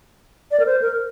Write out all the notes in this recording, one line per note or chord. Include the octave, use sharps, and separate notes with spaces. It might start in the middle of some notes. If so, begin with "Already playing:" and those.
D5
A#4
C5
A#4